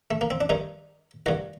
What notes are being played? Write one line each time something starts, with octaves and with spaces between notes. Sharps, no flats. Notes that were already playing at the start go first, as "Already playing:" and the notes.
A3
A#3
C4
D4
G2 D#3 D#4
G2 D#3 F#4